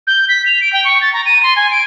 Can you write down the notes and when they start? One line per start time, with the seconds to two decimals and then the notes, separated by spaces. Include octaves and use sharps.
0.07 G6
0.29 B6
0.46 F7
0.61 D7
0.73 G5
0.85 C#6
1.01 A6
1.13 A#5
1.26 D#7
1.43 C6
1.56 G#5
1.71 D7